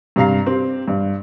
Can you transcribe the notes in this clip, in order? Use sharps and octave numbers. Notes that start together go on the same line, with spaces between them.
G2 C3 F5 A#5 C7
C4 G4
G2